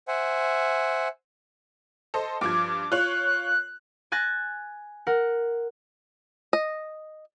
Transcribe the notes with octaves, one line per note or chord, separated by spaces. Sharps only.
C5 E5 F#5 G#5
A4 C5 D#5
G2 F3 D6 G#6
F4 C#5 F#6
G#5 F#6 A6 A#6
A#4 F#5
D#5